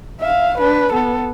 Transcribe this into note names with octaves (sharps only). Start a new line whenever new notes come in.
E5 F5
D4 B4
B3 A4